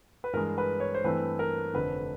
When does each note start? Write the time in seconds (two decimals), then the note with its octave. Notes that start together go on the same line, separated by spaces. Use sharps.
0.24 B4
0.33 G2 E3 G#3 A#4
0.58 B4
0.80 C#5
0.95 C5
1.04 G2 E3 A3 C4 B4
1.39 A#4
1.74 F1 F2 D3 B4